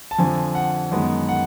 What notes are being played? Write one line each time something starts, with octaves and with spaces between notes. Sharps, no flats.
A5
F2 D3 F3 G#5
F#5
F#2 D#3 G#3 B3
F#5